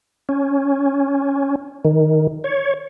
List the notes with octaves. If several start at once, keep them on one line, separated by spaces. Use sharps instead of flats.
C#4
D#3
C#5